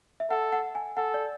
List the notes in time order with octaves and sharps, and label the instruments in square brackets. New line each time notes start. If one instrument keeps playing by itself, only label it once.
[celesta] E5
[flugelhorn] A4 [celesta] F#5
[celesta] F#5
G#5
[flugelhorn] A4 [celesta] F#5
[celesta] D5